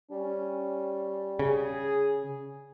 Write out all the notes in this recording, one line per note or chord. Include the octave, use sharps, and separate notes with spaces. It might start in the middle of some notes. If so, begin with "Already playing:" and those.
G3 C#4
C#3 G#4